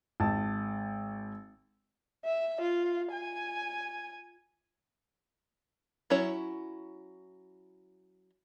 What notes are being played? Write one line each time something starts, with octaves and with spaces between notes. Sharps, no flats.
G#1 A5
E5
F4
G#5
F#3 C#4 E4 C#5